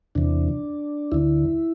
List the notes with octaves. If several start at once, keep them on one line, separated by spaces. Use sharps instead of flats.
E2 C3 E3 D4
D2 D3 E4